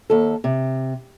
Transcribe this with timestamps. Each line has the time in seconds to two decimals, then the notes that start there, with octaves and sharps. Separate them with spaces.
0.10 D#2 A4
0.44 C3